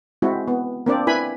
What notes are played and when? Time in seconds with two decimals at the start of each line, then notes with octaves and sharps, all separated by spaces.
0.22 G#3 C4 E4 F#4
0.48 B3
0.86 A#3 C4 D4 D5
1.07 E4 B4 G#5 B5